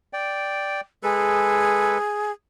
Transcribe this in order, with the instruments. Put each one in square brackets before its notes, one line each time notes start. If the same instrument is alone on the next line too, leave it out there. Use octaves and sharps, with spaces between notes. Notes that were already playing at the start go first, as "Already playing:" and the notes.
[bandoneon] D5 G5
[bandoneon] G#3 A4 B4 [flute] G#4